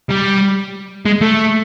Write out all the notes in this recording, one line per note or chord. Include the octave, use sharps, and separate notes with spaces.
G3
G#3
A3